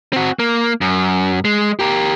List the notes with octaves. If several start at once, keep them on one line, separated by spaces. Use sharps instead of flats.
C4 F#4
A#3
F#2
G#3
G4 A#4